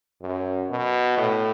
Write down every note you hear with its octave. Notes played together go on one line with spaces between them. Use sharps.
F#2
B2
A2